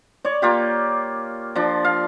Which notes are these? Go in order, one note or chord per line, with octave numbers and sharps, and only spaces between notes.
C#5 D5
A#3 F4 G4
F3 D4
F5